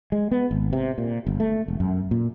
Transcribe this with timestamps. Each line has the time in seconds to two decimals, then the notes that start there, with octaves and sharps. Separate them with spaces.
0.12 G#3
0.31 B3
0.51 G#1
0.73 C3
0.98 A#2
1.27 G1
1.40 A3
1.68 E1
1.80 F#2
2.11 A#2